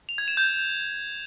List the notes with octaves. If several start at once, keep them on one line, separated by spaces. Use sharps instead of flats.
F7
G#6
E7
G6